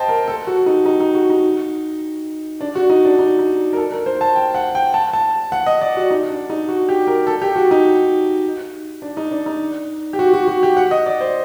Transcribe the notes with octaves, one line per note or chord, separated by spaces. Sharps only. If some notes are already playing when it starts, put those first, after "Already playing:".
Already playing: C5 D#5 G5 A5
A#4
A4
F#4
D#4
D#4
D#4
F#4
D#4
D4
F#4
D#4
D4
D#4
D#4
A#4
A4
A#4
C5
A5
G5
F#5
G5
A5
A5
F#5
D#5
D5
F#4
D#4
D4
D#4
F#4
G4
A#4
A4
G4
F#4
D#4
D4
D#4
D4
D#4
G4
F#4
F#4
F#4
G4
F#5
D#5
D5
C5